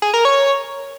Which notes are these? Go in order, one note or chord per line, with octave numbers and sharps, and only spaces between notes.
G#4
A#4
C#5